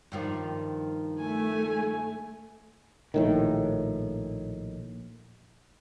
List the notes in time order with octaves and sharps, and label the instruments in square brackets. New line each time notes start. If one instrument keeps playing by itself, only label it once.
[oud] G2 D#3 F3
[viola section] A3 [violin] G#5
[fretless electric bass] A#1 A2 D#3